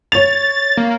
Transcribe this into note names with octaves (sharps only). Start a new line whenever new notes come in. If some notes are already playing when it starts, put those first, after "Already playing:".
C#5 A6 F7
A#3